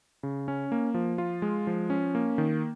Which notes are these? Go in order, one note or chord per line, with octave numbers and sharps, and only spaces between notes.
C#3
C#4
A#3
F3
F4
G#3
F3
C#4
A#3
D#3